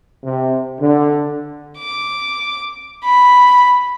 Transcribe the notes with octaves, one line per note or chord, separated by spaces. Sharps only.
C3
D3
D6
B5